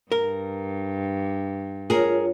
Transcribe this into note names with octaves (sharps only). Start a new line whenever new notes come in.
G2 A#4
F4 G#4 A#4 C#5